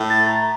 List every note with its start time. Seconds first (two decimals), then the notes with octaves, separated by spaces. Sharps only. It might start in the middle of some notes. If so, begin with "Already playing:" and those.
Already playing: A2
0.10 A6
0.28 A#5